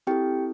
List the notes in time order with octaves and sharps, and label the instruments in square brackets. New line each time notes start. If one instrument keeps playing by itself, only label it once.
[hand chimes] C4 E4 G4 A4 G5